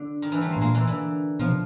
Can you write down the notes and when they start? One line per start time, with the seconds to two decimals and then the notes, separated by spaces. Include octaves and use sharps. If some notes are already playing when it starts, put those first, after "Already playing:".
Already playing: D3
0.22 D#3
0.32 D3 E3
0.41 G3 A3
0.51 G#3 A#3
0.57 A2
0.61 A#2 G#3 A#3
0.75 D3 E3
0.87 D3 E3
1.39 B2 D#3 F3
1.47 C3